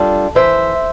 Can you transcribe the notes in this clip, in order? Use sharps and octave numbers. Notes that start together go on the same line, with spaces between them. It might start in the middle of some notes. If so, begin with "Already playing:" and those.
Already playing: G3 D4 F4 A4
E3 C5 E5